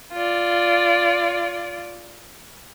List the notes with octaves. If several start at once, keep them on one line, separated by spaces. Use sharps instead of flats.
F4 D5